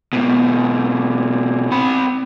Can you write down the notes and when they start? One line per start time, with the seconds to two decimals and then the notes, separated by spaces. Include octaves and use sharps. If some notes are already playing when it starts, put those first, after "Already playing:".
0.13 G#2 B2
1.71 C4 B5